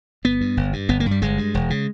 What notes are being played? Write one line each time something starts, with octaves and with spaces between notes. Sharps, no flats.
G1 B3
G2
G1
G2
G1 B3
A#3
G2
G3
G1 G#3
G2
E1
C#3